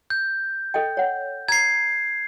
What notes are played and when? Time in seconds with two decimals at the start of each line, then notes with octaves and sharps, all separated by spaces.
0.10 G6
0.74 A4 D#5 G5
0.97 C#5 F#5
1.48 A#5 G#6 C7